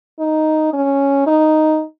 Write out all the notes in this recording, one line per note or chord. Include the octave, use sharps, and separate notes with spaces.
D#4
C#4
D#4